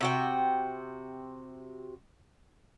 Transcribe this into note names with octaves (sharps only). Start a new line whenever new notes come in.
C3 F#4 G5